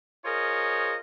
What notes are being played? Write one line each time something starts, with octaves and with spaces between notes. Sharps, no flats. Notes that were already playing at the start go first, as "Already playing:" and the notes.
F4 G#4 A#4 C5 C#5 D#5